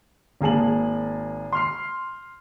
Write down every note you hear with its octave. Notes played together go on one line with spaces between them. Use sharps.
G#1 A#3 G#4 A5 F#7
C6 F6 C7